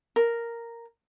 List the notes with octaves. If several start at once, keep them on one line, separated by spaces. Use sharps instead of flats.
A#4